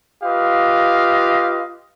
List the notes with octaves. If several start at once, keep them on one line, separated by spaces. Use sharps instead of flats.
F4 G4 B4 D#5 F5